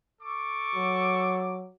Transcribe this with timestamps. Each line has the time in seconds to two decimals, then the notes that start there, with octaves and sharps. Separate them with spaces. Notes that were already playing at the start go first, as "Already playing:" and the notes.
0.22 A4 C#6 D6
0.75 F#3